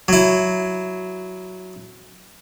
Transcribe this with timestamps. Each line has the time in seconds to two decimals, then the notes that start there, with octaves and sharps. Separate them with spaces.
0.08 F#3 E4